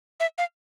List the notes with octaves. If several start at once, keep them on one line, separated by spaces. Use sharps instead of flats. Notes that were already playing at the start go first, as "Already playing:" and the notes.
E5
F5